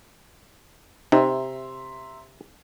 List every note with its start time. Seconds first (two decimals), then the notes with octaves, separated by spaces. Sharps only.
1.12 C3 D#4 E5 A#5 C6